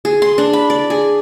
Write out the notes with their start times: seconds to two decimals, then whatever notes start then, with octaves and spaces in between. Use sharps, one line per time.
0.05 G#4
0.22 C6
0.38 D4
0.53 B5
0.70 D5
0.90 G#4